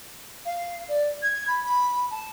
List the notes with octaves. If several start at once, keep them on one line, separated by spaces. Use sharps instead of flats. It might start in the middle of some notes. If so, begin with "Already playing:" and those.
F5
D5
G#6
B5
B5
A5